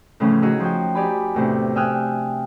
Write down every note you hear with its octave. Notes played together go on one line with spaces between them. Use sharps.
A2 C#3 E3 F3 A3 C#4
D#4 E4 F#4 G#4 D#5
F3 F#4 G5
D#4 G4 D5 G#5 B5
E2 A2 C3 D4
E5 G5 G#5 D#6 F6 F#6